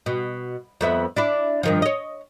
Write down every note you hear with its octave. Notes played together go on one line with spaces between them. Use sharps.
B2
F2 B3 E5
D4 E4 D5
G2 D#3 F3
C#5 D#5